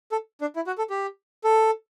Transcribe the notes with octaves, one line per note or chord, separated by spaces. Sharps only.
A4
D4
E4
F#4
A4
G4
A4